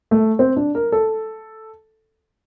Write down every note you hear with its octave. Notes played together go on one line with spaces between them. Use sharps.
A3
C4
D4
A#4
A4